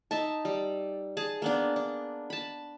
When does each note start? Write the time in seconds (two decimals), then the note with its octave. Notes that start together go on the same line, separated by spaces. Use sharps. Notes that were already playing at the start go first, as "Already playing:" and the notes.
0.11 D#4 E5 A5
0.45 G3
1.17 G#4 A5
1.42 A#3 B3 D4
1.76 D4
2.30 A5 B5